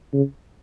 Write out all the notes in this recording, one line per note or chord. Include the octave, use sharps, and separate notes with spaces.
C#3